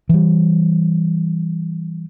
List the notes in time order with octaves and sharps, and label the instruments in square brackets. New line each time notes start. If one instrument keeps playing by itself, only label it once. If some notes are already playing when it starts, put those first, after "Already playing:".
[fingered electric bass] E3 G3